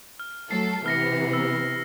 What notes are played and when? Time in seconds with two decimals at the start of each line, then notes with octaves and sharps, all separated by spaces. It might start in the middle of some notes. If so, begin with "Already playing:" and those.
0.20 F6
0.51 F#3 A3 A4 C7
0.86 C3 E3 B3 F6 A#6 C#7
1.33 E6